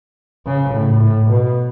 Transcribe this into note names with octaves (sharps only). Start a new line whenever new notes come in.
C#3
A2
A2
B2